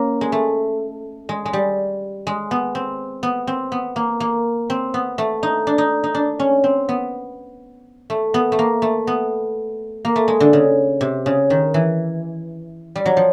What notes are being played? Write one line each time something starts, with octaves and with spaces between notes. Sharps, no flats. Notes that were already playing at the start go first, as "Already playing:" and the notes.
Already playing: A#3 C#4
G#3
A3
G#3
G#3
G3
G#3
B3
C4
B3
C4
B3
A#3
A#3
C4
B3
A3
D#4
D4
D#4
D#4
D4
C#4
C4
B3
A3
B3
A3
A#3
A3
B3
A#3
A3
G#3
D3
C#3
C3
C#3
D#3
E3
G3
F#3
F3